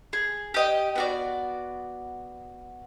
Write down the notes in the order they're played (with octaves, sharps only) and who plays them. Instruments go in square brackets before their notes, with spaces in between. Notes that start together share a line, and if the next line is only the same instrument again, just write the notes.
[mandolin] G#4
G4 D#5 G5
B3 F#4 D5